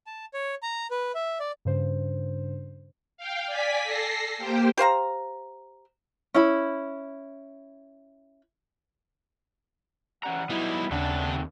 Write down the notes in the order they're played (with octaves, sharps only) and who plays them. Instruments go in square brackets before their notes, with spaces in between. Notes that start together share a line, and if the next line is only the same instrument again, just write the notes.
[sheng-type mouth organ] A5
C#5
A#5
B4
E5
D5
[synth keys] G2 C#3 C5
[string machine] F5 G5
D5 G#5 B6
A4 A#6 C7
A#3 G4 C5 G5
[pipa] G4 C5 F5 A#5
[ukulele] C#4 E4 B5
[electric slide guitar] E3 C#4 A#5 [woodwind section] G3 F#5
[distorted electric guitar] F#3 G3 [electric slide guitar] B3 D#4 [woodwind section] E4
[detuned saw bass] D#2 [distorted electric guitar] C#3 [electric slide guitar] A3 C4 F#5 [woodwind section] D4